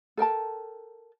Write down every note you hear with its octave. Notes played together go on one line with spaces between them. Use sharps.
A4 A#4 G5 A5